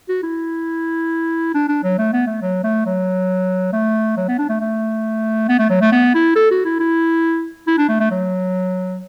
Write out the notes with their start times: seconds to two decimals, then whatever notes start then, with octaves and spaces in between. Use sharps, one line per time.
0.09 F#4
0.23 E4
1.54 D4
1.69 D4
1.83 F#3
1.98 A3
2.13 B3
2.27 A3
2.42 F#3
2.64 A3
2.86 F#3
3.73 A3
4.17 F#3
4.28 B3
4.38 D4
4.49 A3
4.61 A3
5.49 B3
5.59 A3
5.70 F#3
5.81 A3
5.92 B3
6.14 E4
6.36 A4
6.51 F#4
6.65 E4
6.80 E4
7.67 E4
7.78 D4
7.89 A3
8.00 A3
8.11 F#3